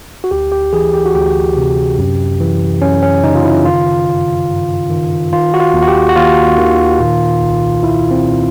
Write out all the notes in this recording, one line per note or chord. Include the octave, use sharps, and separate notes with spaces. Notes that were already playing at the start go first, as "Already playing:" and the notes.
F#4
D2 G4
G4
E3 G#4
G4
F#4
D2 G4
C3
F#2
E3
F#2 C#4
C#4
C#3 D#4
F4
E4
D#3 F4
G2
G2
D#3
D#3 F4
F#4
F4
D#2
F#4
G4
F#4
D#2 F4
D#3
A#2
C2
C2 E4
C4
A#2